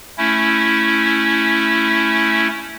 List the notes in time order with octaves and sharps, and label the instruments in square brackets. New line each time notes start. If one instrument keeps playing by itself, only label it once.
[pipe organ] A3 C#4 E4